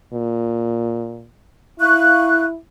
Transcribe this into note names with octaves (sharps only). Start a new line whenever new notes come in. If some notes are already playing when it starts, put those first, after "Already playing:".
A#2
E4 F5 C#6 F#6